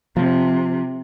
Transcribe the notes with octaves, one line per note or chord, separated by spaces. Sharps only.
C3 F3